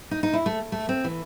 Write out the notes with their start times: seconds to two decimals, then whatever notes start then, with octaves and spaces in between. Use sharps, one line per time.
0.11 D#4
0.23 D#4
0.33 E4
0.46 A3
0.72 A3
0.89 C4
1.04 E3